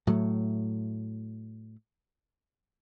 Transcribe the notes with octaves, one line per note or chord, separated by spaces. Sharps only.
A2 F#3 A3